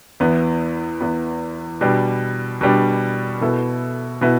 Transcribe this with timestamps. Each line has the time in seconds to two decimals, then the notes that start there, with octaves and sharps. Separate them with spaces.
0.20 E2 E3 B3
1.01 E2 E3 B3
1.81 B2 G3 D4
2.61 B2 G3 D4
3.41 B2 B3 E4 A4
4.21 B2 B3 E4